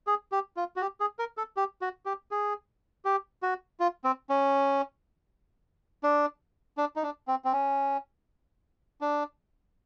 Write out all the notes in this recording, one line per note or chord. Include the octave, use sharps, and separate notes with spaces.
G#4
G4
F4
F#4
G4
G#4
A#4
A4
G4
F#4
G4
G#4
G4
F#4
F4
C4
C#4
D4
D4
D#4
D4
C4
C4
C#4
D4